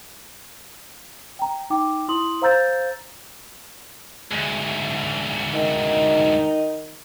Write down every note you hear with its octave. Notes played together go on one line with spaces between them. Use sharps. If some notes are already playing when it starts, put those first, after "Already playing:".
G5 A#5
D#4 G5 D6
E4 C6 D#6 F#7
C5 F5 A#5 E6 G6 A6
D2 G#2
D#3 D#4